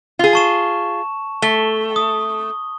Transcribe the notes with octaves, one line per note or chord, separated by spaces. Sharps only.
F4 G#4
A5 C#6 E7
A3 G7
D#6